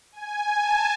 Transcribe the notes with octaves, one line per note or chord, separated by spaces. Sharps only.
G#5
A5